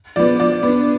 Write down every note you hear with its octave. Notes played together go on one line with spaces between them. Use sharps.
F3 B3 D5
F3 D5
B3 D4